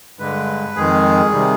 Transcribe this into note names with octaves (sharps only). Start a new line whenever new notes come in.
G2 D3 G#3 B4
F2 D#3 G#3 G#4
C3 D#3 G3